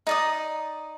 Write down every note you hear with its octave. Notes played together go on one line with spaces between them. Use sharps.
D#4 D5 D#6